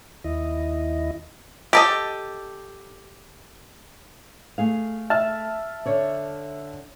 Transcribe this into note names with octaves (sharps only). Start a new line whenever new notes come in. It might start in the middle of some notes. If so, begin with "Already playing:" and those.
D#2 E4 D#5
G4 A4 D#5
A3 G#4 F5
E5 A5 F6
D3 C#5 D5